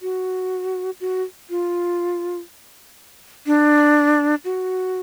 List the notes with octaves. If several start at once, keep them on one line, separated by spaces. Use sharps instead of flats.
F#4
F#4
F4
D4
F#4